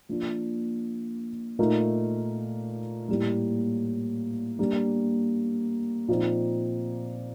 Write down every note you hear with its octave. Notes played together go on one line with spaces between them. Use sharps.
F3 A#3 D4 F4
A#2 A3 D#4 A#4
A2 G3 A#3
G3 A#3 D4
A#2 F3 C4 D#4